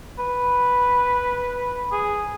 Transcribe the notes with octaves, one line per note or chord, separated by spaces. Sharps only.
B4
G#4